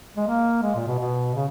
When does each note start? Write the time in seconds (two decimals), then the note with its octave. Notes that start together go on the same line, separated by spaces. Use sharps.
0.17 G#3
0.27 A#3
0.63 G#3
0.75 A#2
0.87 B2
0.99 B2
1.35 C#3